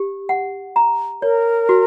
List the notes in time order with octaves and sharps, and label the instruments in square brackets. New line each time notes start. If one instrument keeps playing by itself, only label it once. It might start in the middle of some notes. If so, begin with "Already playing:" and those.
Already playing: [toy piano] G4
F#5
A#5
[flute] A#4 [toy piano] C#5
[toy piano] F#4